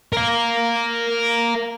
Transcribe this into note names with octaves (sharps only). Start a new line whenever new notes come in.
A#4 F5